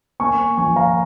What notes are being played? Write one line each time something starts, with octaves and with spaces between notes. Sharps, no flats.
A#3 G#5 C#6
F3 G#5 C#6
F5 A#5